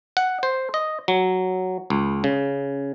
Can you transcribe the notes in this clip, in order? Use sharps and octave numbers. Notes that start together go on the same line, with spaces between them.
F#5
C5
D#5
F#3
C#2
C#3